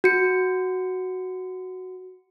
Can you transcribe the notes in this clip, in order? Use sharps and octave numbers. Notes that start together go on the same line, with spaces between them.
F#4 C#7